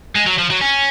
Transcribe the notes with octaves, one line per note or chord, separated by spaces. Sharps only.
G#3
F#3
F3
F#3
C#4